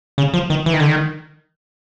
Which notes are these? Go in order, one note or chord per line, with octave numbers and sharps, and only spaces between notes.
C#3
F3
D#3
E3
D#3
D3
D#3